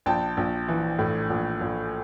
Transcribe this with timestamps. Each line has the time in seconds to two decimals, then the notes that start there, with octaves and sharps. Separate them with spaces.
0.06 A#1 G5 A5
0.37 A#1
0.68 E3
0.99 A2
1.30 A#1
1.61 A#1